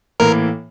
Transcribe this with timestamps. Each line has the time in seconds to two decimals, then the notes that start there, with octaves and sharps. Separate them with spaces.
0.20 A2 E3 A#3 A#4